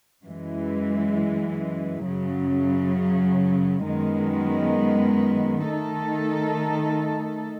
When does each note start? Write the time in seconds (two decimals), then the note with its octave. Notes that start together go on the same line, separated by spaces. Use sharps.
0.24 F#2 E3 G#3
2.05 F#2 C#3 F#3
3.86 F#2 D#3 G#3 B3
5.67 D#3 A3 D#4 A4